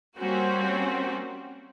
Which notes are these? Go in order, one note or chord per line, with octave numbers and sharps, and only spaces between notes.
G3 A#3 C4 C#4 F#4